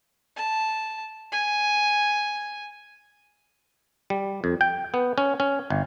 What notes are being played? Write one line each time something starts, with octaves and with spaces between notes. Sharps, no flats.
A5
G#5
G3
F2
G5
B3
C#4
C#4
G1